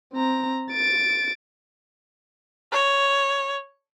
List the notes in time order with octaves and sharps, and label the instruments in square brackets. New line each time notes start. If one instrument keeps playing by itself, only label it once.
[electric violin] C4 A#5
A6 D7
[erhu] C#5